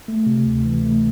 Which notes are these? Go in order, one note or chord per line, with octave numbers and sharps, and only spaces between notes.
A3
C3
D2
E3
A3